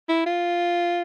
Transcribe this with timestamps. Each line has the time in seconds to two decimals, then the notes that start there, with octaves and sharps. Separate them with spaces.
0.09 E4
0.26 F4